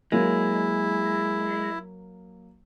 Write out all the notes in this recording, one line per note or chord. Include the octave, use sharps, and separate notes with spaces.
F#3 G#3 A#3 E4